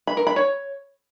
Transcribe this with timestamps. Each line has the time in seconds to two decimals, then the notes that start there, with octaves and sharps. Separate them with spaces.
0.07 B5
0.17 A#4
0.27 B5
0.36 C#5